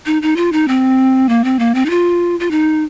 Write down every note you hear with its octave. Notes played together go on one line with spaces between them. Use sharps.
D#4
D#4
F4
D#4
C4
A#3
C4
A#3
C4
D#4
F4
F4
D#4